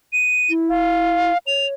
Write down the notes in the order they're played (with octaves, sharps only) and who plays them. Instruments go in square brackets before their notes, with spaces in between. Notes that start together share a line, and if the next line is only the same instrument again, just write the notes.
[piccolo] D#7
[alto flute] E4
[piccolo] F5
[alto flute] C#5 [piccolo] F7